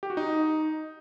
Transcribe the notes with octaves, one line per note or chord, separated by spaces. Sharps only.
G4
F#4
D#4